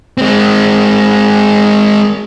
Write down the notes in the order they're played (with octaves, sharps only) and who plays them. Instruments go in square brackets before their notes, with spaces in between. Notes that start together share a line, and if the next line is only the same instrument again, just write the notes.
[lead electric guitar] G#3 C4